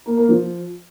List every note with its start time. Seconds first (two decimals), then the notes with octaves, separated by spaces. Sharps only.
0.06 A#3
0.17 A#3
0.29 F3